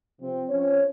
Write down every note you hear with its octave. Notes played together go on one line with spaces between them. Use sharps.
C3 F3 C4
F3 C4 C#4 C#5